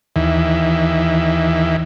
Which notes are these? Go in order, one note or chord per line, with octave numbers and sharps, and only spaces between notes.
D#2 E3